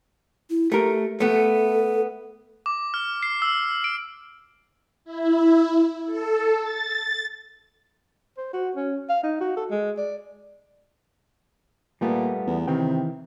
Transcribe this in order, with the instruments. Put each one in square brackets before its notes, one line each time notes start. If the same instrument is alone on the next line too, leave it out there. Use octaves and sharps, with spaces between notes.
[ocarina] E4
[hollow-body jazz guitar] A3 A#4 [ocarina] G4
[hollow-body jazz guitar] A3 B3 [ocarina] A4
[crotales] D6
F6
C7
E6
D7
[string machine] E4
A4
A6
[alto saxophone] C5
F#4
C#4
F5
D#4
F#4
A4
G#3
D5
[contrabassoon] A#2 [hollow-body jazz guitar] G3 A3 B3
[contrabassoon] E2
[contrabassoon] C3 [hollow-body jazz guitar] D#3 E3 G5